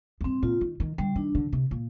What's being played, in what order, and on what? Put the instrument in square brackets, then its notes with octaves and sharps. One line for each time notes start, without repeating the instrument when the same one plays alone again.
[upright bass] F2
[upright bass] G2 [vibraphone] C4
[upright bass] A#2 [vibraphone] F4
[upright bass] D#3
D#3
[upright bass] D3 [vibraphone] G3
[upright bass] D#3 [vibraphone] D4
[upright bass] D3
C3
A#2